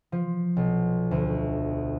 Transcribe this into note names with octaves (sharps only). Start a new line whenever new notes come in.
F3
B1
D2